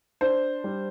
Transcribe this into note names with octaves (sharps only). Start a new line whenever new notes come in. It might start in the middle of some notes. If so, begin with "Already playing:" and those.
D4 C5
G3